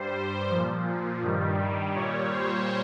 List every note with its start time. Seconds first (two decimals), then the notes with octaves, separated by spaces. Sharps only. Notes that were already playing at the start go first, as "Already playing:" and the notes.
Already playing: G2 G3 C5
0.50 A#2 F3
1.22 G2 D#3 G3
1.94 A#2 G3 C#5
2.30 C5